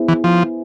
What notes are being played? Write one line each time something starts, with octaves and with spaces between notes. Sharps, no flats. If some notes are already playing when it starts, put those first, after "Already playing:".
Already playing: B3 E4 G#4 C5
E3
F3